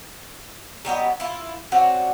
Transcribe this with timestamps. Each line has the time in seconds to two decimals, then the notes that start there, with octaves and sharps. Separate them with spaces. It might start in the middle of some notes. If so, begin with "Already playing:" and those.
0.85 F#3 G3 B3 D#5
1.20 E4 F4
1.72 C4 D4 F#4 C#5